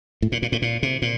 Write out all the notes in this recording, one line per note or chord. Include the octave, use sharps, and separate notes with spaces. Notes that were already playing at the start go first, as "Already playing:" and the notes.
A2
A#2
A#2
A2
A#2
C3
A#2